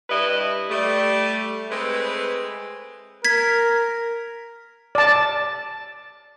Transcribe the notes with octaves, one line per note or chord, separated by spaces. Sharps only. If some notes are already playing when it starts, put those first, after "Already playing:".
G2 G3 E4 B4 D#5
G3 A3
G#3 A3 C4 B4
A#4 G#6 B6
D5 A5